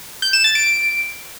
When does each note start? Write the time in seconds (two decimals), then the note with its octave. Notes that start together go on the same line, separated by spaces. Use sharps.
0.22 G6
0.33 E7
0.44 A6
0.55 D7